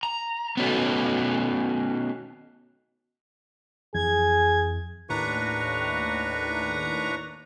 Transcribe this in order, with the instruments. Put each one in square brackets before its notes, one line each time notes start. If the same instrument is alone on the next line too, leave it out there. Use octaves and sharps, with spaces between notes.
[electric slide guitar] A#5
B3 C#4 D#4 F#4 A4
[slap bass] F2 E3 [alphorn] G#4 [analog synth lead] G#6
[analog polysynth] D#2 A2 A#5 [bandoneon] D4 B4 C#6